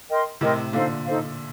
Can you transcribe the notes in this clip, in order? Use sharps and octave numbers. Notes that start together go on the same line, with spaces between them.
A#4 D#5 G5 C6
A2 C3 A#4 D#5 G5 C6
A#2 D3 D#4 A4 C5 F5
D#4 A4 C5 F5